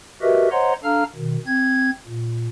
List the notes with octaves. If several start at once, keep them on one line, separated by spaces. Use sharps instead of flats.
F#4 G4 A#4 B4 D#5 E5
C5 C#5 D#5 F#5 A#5 C6
D4 A4 F5 A#5 F6
B2 D#3
C4 G#6
A#2